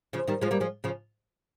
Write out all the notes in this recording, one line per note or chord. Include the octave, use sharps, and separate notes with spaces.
C#3 F3
D#3 G3
F3 G#3
G3 A#3
F3 G#3
C#3 F3